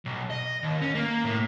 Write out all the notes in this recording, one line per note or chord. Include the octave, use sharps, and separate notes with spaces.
B1
D#5
D#2
C#4
A#3
A2